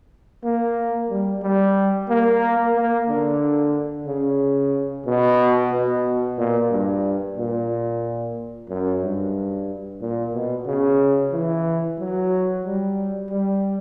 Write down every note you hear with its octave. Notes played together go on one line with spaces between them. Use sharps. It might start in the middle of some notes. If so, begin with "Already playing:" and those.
A#3
G3
G3
A#3
A#3
D3
C#3
B2
B2
A#2
G2
A#2
F#2
G2
A#2
B2
C#3
E3
F#3
G3
G3